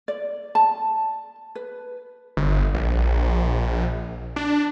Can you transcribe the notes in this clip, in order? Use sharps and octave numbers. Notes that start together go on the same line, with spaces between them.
D5
A5
B4
G1
A#1
D4